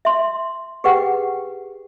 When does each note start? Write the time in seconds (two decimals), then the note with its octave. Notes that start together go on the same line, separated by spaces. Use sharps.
0.05 E5 C6
0.84 G4 G#4 B4 F#5 G5